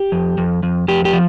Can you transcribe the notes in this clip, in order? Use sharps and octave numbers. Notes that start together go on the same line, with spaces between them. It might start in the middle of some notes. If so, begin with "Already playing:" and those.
Already playing: G4
F2
F2
F2
F2 G4
G4
F3